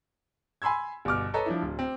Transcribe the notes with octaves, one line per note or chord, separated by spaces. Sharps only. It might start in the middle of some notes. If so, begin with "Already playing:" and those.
G#5 B5 C6 E6 G#6
G1 B2 D6 F6
A4 B4 C#5 D#5 A5 A#5
F3 D4 E4
D1
C4